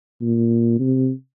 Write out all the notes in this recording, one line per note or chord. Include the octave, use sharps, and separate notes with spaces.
A#2
C3